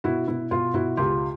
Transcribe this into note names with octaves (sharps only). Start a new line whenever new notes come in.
B2 E4 F#4
B2 E4
B2 F4
B2 E4 F#4
C#2 F4 G4